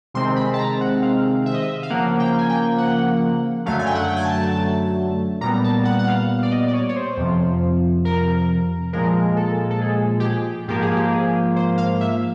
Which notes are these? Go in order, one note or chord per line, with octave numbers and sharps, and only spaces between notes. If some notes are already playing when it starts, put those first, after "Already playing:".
C3 D#3 G#3 C4 C6
B5
A5
A#5
F#5
F5
E5
D#5
E5
F5
C#3 F3 A#3 F#5
G5
G#5
G5
F#5
F#2 D3 F#3 A3 F5
G#5
G5
F#5
G5
G#5
A5
A#2 G3 B3 A#5
A5
F#5
F#5
F5
D5
D#5
D5
C#5
C#5
C5
F2 C3 F3
A#4
A#2 F3 G#3 A#4
A4
A4
G#4
G4
G#4
G#2 F3 A#3 G4
G#4
G4
G#4
C5
F5
E5